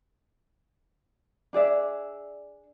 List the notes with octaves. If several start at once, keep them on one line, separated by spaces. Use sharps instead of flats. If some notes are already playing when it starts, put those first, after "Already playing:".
D4 G#4 D5 E5